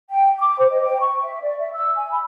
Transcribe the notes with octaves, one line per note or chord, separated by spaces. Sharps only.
G5
D6
C5
D#5
G5
C#6
E5
D5
E5
E6
G#5
B5